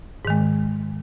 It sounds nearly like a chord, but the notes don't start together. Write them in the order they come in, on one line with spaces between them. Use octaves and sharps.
G#2 D#3 G#3